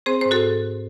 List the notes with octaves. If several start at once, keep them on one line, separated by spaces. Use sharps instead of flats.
C4 G#4 C5
G#2 C5
F#4 A4